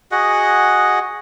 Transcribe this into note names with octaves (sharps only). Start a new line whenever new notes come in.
F#4 G#4 D#5 F#5